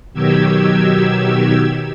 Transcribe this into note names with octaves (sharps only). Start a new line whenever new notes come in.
B2 D#3 F#3 G4 E6 G#6